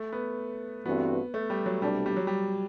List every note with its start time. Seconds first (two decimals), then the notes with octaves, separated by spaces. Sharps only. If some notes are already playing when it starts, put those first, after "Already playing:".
Already playing: A3
0.13 B3
0.86 G2 E3 A3 B3 C4 F#4
1.34 A3
1.50 G3
1.66 F#3
1.82 C2 B2 G3 A3 D4
2.06 G3
2.16 F#3
2.27 G3